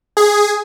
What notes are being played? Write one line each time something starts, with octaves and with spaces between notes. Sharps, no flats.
G#4